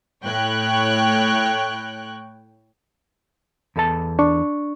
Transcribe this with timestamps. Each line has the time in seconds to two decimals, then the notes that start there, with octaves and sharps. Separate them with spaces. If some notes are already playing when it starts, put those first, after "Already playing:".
0.24 A2 C#5 G5 C#6 F#6
3.76 E2 A4 A5
4.19 D4 C#6